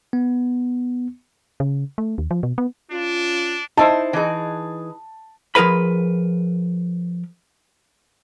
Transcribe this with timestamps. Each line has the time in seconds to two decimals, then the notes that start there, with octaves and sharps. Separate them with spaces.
0.13 B3
1.60 C#3
1.98 A3
2.18 D#2
2.31 F3
2.43 B2
2.58 B3
2.91 C#4 D4 F4
3.77 D#4 E4 C5 A5
4.13 E3 D#4 G#4
5.55 F3 G#4 A#4 B4 B5